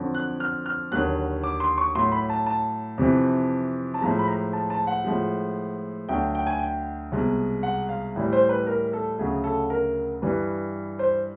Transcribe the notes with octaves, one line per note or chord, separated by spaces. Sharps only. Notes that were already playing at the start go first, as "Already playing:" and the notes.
Already playing: F2 D3 F#3
F#6
F6
F6
D#2 D3 F#3 F#6
D6
C6
C#6
A2 F#3 C6
B5
A5
A5
F2 C3 E3
A5
A2 F3 G#3 A#5
B5
A#5
A5
A5
F#5
A2 F3 G#3
D2 D3 F#3 G5
G5
G#5
G5
C2 B2 G#3
F#5
F5
A2 E3 G3
C5
B4
A#4
A4
D2 C#3 F#3 G#4
A4
A#4
G2 E3 G3 B4
C5